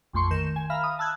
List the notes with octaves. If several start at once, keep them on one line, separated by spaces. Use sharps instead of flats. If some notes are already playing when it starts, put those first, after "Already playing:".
A#1 F2 A3 C6 C#6
D#3 A#4 G6 E7
G#5
E5 F5 A#5 B5 F6
D#6
A5 E6 F#6 G#6